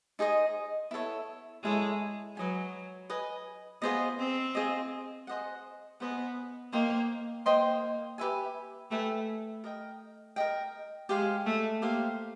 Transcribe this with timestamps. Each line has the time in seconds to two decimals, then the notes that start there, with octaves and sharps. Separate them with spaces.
0.19 D#4 G#4 C5 D#5
0.91 B3 E4 A4 C#5
1.64 G#3 E4 A4 C#5
2.36 F#3 B4 D#5 G#5
3.10 B4 D#5 G#5
3.82 B3 F4 G#4 C5 D#5
4.19 C4
4.55 F4 G#4 C5 D#5
5.27 G#4 C5 D#5 F#5
6.00 B3 G#4 C5 D#5 F#5
6.72 A#3 C5 D#5 G5 C6
7.46 A#3 C5 D#5 G5 C6
8.18 G4 B4 E5 G#5
8.91 A3 G4 B4 E5 G#5
9.64 A#4 D#5 G5
10.36 A#4 D#5 G5
11.09 G#3 G4 C5 F5
11.46 A3
11.82 A#3 G4 C5 F5